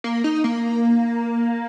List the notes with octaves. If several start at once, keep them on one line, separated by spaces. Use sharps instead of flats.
A#3
D#4
A#3